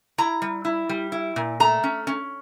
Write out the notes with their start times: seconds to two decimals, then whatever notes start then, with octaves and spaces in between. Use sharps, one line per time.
0.18 E4 A#5
0.42 G3
0.65 E4
0.89 G3
1.12 E4
1.36 A#2
1.60 A3 A#5
1.84 C#4
2.07 C#4